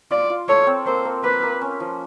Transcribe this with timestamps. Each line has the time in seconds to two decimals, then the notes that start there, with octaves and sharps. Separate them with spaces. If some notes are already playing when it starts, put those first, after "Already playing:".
0.11 F4 D5
0.30 F4
0.48 A4 C#5
0.67 C4
0.86 A#3 C5
1.05 A#3
1.24 A#3 B4
1.43 A#3
1.61 C#4
1.80 F3